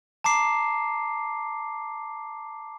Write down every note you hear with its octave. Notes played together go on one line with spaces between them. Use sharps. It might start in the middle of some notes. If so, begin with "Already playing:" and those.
A5 A#5 D6 C7